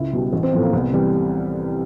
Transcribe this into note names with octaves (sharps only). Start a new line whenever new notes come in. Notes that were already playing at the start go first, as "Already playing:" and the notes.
Already playing: C#2 E4
B2 G3
A1
C4
A2 F3 B3
A#3
C2 B3
C3 E3 G3